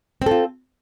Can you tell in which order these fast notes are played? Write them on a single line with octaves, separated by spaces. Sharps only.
C4 A4 F4